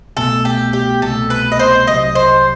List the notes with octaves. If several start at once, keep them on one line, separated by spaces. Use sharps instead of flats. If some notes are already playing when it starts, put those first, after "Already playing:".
C2 B2 A3 A4
G4
G4
C2 B2 A3 A4
B4
D#5
C5
C2 C3 F#3 D#5
C5